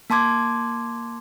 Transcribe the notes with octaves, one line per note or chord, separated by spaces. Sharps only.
A#3 A5 C6 D6 G#6